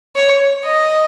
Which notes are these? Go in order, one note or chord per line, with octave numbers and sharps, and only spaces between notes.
C#5
D#5